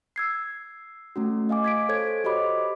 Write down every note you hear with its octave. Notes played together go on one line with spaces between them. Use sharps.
E6 G#6 C7
A3 C#4 F#4
D#5 F5 G#5 D6
G#6 B6 D7
A4 C5 C#5 G#6 D7
F#4 G4 C5 D#5 B5 D6